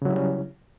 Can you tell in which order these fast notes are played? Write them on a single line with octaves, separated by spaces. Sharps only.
C#3 F#3 E4 G3 C#4